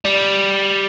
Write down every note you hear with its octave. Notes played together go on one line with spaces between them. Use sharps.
G3